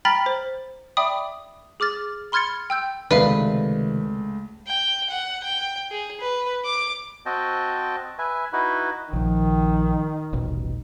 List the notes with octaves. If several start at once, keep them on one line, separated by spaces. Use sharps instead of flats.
G5 A#5 B5 F6 A6 B6
C5
D5 E5 G5 B5 D6 D#6
G#4 D6 F6 A6
B5 C6 F6 G#6 A6 C#7
G5 E6 G6
C#2 C3 D#3 A3 B4 D5 E5 F5
G5
F#5
G5
G#4
B4
D6
C4 F#4 D#5 G5 A5
B4 E5 G#5
D#4 E4 F#4 B4
A#1 D#3 F3
D#1 A1 B2